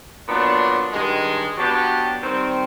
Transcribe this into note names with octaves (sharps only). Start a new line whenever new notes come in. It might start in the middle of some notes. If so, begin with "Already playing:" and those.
A#2 F#3 B3 D4
G2 D#3 G#3
F#3 B3 D4 G4
D#3 G3 C4